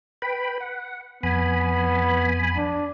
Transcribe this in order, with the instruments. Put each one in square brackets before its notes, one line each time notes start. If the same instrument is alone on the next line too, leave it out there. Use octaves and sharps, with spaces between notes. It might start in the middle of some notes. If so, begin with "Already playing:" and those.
[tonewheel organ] B4 G5 B5
F#5
[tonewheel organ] F2 G#5 B5 [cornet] B3
[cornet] D4